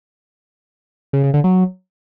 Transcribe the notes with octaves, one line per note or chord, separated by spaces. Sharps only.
C#3
C#3
D3
F#3